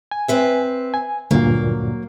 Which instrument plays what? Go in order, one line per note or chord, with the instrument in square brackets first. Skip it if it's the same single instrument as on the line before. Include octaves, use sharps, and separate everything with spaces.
[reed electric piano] G#5
[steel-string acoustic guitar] C4 B4 E5
[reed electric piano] G#5
[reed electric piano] D2 G2 A#2 [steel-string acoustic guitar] F#3 A#3